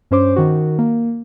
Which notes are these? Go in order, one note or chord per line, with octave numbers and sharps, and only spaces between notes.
G2 C#4 C5 D6
D#3 F#4
A#3